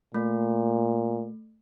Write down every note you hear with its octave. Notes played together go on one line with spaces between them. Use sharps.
A#2 A3